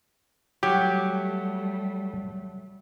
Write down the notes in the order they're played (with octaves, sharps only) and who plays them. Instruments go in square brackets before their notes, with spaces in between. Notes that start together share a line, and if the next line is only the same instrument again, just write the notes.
[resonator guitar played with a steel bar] F#3 [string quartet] G3 A3 [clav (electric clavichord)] G4